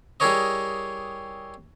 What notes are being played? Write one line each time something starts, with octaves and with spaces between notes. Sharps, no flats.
G3 E4 G#4 A#4 C#5 D#5